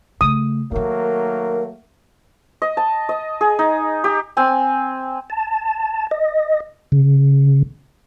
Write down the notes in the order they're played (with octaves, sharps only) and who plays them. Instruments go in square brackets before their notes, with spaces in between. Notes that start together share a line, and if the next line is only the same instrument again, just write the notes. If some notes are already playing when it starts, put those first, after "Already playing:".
[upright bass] C#3 A3 [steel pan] D#6
[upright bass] D#3 D#4 [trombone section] F#3 A3 A#3 [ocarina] A#4
[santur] D#5
A5
D#5
G#4
D#4
G4
C4 G#5
[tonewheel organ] A5
D#5
C#3